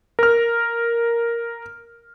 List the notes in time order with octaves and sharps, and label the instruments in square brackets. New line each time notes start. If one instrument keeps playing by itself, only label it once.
[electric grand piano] A#4 F6